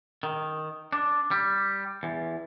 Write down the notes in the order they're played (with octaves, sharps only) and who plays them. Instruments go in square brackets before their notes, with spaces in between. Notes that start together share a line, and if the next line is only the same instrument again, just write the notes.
[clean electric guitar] D#3
D4
G3
E2